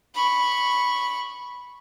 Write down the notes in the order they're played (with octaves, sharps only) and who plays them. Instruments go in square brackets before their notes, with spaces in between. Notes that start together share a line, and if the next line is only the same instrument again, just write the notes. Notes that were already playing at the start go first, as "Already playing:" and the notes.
[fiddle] B5 C#6